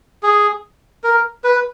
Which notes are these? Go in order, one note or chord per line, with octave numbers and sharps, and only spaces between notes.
G#4
A#4
B4